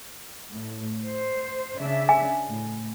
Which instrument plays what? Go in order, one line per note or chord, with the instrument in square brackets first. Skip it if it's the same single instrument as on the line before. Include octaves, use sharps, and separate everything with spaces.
[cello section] A2
C5
C#3 D4 E5
[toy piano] G#5
[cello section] A2